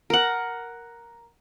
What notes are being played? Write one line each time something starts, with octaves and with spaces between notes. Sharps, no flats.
A#4 F#5